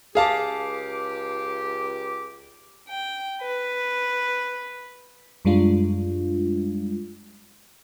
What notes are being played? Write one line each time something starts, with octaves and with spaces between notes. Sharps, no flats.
C#2 G4 G#4 F5 A5 D6
G5
B4
F#2 G3 G#3 D4 F4